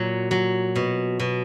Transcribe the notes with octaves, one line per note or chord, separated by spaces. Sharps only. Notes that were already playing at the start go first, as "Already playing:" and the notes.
Already playing: A#2 F#3
F#3
B2
B2